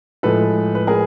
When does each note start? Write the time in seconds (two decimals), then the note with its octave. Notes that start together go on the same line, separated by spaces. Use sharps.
0.23 A2 F3 G#3 A4 B4
0.75 B4
0.87 G#4 A#4